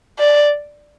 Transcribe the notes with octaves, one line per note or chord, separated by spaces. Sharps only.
D5